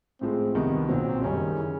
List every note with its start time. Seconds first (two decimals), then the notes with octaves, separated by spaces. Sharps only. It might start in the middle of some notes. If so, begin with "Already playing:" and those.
0.21 A2 F3 G#3 C4
0.54 C2 C3 D#3 B3
0.88 B1 A#2 F#3 C4
1.21 F#1 F#2 D#3 G3 C#4
1.56 C#3 E3